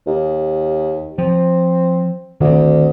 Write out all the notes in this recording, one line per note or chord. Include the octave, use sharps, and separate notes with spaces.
D#2
F3 C4
D2 D#3 C4